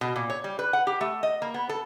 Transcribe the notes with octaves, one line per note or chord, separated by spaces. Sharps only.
B2
A#2
C#5
G3
B4
F#5
G4
A3
D#5
A#3
B3
A4